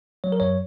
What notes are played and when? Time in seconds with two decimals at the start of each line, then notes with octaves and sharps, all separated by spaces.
0.24 F#3 C#5
0.32 A#4
0.40 F#2 C#5